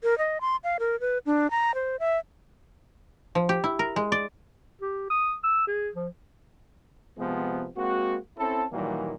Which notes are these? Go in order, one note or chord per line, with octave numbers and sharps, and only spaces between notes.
A#4
D#5
C6
F5
A#4
B4
D4
A#5
C5
E5
F3
G4
E4
A#4
G#3
D5
G4
D#6
E6
G#4
F3
C3 F3 G#3 B3
G#3 A#3 C4 F#4
C4 C#4 E4 A4
A#2 D#3 E3 F#3 G3 A#3